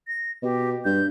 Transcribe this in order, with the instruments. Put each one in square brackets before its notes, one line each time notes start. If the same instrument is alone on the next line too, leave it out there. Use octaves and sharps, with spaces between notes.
[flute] A#6
[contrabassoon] B2 [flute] G4
[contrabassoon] G2 [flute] G6